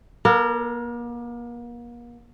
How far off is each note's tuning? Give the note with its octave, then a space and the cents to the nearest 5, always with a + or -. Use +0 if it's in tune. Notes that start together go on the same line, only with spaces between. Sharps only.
A#3 +40 A#4 -30